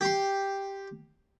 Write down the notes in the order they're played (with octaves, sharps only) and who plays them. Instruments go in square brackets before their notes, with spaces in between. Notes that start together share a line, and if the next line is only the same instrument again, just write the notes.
[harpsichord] G4 C6